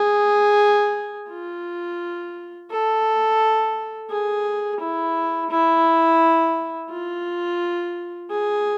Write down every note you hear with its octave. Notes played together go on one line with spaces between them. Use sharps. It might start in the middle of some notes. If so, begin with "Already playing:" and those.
Already playing: G#4
F4
A4
G#4
E4
E4
F4
G#4